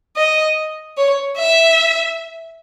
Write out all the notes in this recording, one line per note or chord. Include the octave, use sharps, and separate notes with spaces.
D#5
C#5
E5